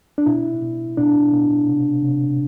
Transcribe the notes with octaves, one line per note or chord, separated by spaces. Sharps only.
D4
B2 E4
B2
B2 D4
B2
C3
C3